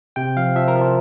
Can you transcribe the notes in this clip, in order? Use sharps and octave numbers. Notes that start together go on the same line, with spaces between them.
C3 G5
F3 F5
F3 E5
A#4
F3
F4